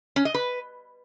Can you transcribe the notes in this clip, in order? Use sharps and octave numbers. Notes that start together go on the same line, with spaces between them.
C#4
D#5
B4